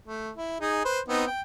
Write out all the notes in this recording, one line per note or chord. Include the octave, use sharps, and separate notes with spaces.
A3
E4
D#4 G#4
B4 C5
B3 C4 D#4
G5